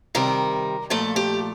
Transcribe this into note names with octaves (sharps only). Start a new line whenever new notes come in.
C3 D#3 G3 A#4
A#2 F3 A3 A4
G4